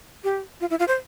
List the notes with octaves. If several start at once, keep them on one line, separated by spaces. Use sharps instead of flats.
G4
F4
E4
F4
C5